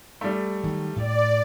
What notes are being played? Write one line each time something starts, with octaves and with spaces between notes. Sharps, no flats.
G3 A3
D#3 F#3
A2 D5